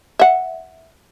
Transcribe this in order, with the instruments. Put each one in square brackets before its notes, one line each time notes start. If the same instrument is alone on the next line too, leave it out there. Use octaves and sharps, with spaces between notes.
[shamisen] E5 F#5